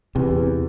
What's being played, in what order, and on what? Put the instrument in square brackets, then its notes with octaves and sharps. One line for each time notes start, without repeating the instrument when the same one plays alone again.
[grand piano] E2 [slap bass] C3